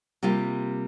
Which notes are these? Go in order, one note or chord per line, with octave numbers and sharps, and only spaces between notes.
C3 G3 A#3 F4